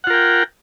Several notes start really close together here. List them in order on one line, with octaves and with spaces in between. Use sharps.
F#5 F4 A#4 G5